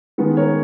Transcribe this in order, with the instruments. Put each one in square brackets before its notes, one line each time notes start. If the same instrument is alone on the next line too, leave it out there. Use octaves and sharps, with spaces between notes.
[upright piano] D#3 G#3 B3
A#4 C#5